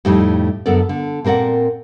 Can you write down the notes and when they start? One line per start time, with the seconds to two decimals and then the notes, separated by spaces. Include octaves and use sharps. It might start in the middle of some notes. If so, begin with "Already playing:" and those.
0.05 F2 A2 G3 A3 D#4
0.66 F#2 D3 B3 A4 A#4 D5
0.89 D3
1.25 A#2 C4 A#4 D5 F#5